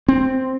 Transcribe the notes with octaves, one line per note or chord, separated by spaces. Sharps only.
C4